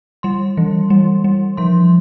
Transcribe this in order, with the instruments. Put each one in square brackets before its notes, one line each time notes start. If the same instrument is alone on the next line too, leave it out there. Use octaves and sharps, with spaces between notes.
[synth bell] G3 C6
E3
G3
G3
F3 C6